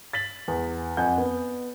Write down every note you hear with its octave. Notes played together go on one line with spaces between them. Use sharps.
A6 B6 F#7
E2
F2 F#5 G#5 G6
B3